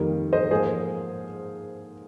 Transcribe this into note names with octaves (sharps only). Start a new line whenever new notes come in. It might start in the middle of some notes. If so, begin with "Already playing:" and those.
Already playing: F2 D#3 G3 A#3
C5 D#5
G#2 F3 A#3 G#4 C5